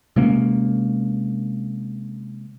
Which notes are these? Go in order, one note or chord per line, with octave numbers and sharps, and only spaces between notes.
C3 G#3 A#3 C#4